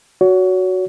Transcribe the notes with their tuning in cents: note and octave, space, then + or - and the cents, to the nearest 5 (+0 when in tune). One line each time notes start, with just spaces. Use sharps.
F#4 +0 C#5 +30